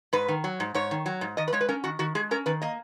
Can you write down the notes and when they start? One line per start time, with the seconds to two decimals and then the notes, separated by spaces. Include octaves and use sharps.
0.13 G#2 B4
0.28 D#3
0.44 F#3
0.60 G#2
0.74 G#2 C#5
0.91 D#3
1.06 F#3
1.21 G#2
1.37 D#3 D#5
1.48 B4
1.53 G#3 C#5
1.61 B4
1.69 C#4 A#4
1.84 D#3 F#4
1.99 D#3 F#4
2.15 G#3 G#4
2.31 C#4 A#4
2.46 D#3 B4
2.62 A#3 D#5